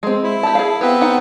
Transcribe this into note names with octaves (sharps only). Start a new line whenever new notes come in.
G#3 C4
E4
G4 A5
G#4 F5
B3 C4 G4 B4
D#4 F#5